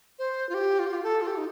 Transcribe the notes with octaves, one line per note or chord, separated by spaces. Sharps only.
C5
F4
G4
F4
G4
F4
A4
F4
G4
D#4